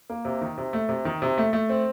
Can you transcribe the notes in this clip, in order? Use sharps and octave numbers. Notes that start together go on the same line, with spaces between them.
A#3
C3
D#3
C3
A3
C3
D#3
C3
A3
A3
C4